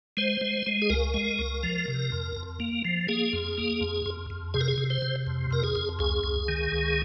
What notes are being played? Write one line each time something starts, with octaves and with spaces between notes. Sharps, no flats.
G#3 C5
G#3
G#3
G#4
C#2 A#4
G#3
C#2
F3
C3
F2
F2
A#3
F3
A#3 G#4
F2
A#3
F2
F2
F2
C3 G#4
A#4
G#4
C3
C5
C3
F2
F2 A#4
G#4
F2
C#2 G#4
C#2
D#3
C#2